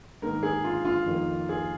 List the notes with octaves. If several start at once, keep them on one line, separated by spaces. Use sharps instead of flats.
G#2 D#3 A#3 A#4
G#4
F4
F4
F2 D#3 A#3
G#4